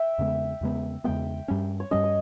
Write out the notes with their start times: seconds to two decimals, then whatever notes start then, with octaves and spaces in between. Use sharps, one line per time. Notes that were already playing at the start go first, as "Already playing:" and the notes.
Already playing: E5 G5
0.18 E2 C#3 G#3 B3
0.61 E2 C#3 G#3 B3
1.04 E2 C#3 G#3 B3 G5
1.48 G2 G3 C#4
1.80 C#5
1.91 G2 G3 C#4 D#5
2.04 D#5